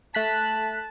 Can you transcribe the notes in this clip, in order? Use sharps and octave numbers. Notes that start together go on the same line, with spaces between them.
A3 A5 F#6 B6